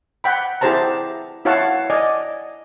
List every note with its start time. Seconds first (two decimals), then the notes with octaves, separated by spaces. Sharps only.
0.24 F#5 G5 B5
0.61 E4 G4 G#4 C5 A5 A#5
1.45 E4 F#4 C#5 F5 F#5 A5
1.90 D5 D#5 G#5